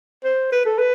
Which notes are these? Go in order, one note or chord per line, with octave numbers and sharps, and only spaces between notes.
C5
B4
A4
B4